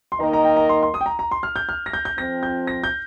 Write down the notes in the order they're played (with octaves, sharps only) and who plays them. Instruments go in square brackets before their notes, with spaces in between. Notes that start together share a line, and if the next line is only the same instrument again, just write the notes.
[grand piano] C6
[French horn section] D#3 A#3 D#4 A#4 D#5 [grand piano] A#5
[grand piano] A#5
G5
A#5
C6
C6
D#6
G5
A#5
A#5
C6
F6
G6
F6
A#6
G6
G6
[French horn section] F2 F3 C4 [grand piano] A#6
[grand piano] G6
A#6
G6